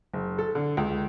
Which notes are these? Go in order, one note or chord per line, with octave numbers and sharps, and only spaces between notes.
F#1
A4
D3
C#2